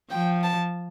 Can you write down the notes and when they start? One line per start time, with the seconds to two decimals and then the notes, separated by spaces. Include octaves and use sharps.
0.11 F3 G5
0.44 A5